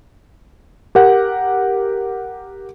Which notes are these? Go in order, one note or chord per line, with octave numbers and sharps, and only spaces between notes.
G4 A#4 F#5